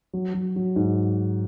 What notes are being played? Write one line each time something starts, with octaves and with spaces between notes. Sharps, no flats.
F#3
F#3
F#3
G#2